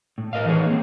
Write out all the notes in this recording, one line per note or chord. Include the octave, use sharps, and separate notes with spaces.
A2
A#4 D#5 F5
E3 D#4 G#4 C#5
A#3 C4